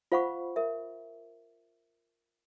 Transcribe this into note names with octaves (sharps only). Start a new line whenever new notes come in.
F4 C5 F5 F#5 B5 C#6
A#4 E5